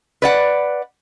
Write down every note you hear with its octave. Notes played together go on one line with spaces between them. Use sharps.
B4 D5 F#5